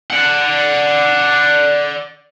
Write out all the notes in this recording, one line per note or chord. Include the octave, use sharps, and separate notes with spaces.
D5 F#5